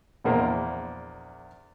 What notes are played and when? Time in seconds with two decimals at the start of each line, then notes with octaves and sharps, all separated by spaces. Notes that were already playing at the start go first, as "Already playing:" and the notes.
0.24 A#1 E2 A#3 C5